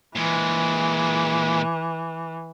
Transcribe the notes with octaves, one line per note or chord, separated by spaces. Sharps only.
A#2 E3 G#3